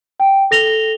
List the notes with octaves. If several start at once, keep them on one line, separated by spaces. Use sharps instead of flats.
G5
A4 A#6 F7 G7